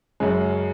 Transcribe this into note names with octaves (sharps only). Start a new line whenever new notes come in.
F#2 C#3 G#3